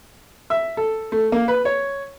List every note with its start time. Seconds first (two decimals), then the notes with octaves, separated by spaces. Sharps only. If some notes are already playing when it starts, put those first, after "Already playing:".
0.50 E5
0.77 A4
1.12 A3
1.32 A#3
1.48 B4
1.65 C#5